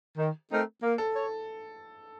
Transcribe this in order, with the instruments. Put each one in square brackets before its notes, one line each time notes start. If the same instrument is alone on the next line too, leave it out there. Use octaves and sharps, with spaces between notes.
[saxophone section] D#3
A3 C4 D#4 A#4
A#3
[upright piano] A4
[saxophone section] C#5